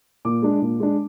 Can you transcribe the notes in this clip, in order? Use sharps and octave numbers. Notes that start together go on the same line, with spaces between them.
A#2 D6
G#3 D4
A#2
G#3 D4